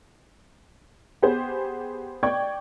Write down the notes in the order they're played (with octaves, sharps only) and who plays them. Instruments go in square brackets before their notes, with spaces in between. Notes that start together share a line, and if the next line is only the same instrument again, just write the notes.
[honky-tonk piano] B3 G4 G#4 C5
D5 G5 C#6 G#6